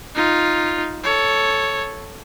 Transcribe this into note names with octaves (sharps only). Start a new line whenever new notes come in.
D#4 F4
A4 C#5